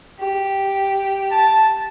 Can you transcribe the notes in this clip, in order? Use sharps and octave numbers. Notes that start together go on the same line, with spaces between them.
G4
A5